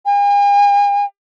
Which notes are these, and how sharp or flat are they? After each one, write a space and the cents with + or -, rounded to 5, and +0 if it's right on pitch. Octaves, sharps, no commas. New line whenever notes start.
G#5 -45